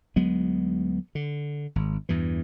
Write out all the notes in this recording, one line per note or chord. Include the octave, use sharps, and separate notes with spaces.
D2 F#3 G#3 B3
D3
G#1
E2 G2 E3